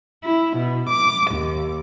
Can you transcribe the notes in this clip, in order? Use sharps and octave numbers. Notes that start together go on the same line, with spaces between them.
E4
B2
D6
D#2